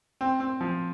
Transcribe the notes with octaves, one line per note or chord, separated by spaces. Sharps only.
C4
C4
F3